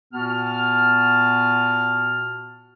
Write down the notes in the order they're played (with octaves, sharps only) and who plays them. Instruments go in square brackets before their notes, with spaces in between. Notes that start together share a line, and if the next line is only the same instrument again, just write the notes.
[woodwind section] A#2 B3 F#4 A5 F6